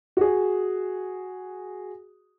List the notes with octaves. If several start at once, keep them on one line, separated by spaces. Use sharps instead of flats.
F#4 G#4